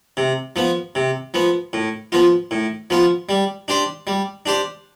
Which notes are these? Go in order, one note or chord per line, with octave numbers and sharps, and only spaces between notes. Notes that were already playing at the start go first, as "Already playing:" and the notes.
C3
F3 B3
C3
F3 B3
A2
F3 B3 F4
A2
F3 B3 F4
G3
D4 G4 C5
G3
D4 G4 C5